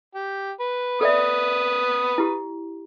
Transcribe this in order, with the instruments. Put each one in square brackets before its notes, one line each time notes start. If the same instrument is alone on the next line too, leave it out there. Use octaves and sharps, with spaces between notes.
[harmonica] G4
B4
[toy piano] A4 D5 E5 [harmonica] B4 D#6
[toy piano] E4 G4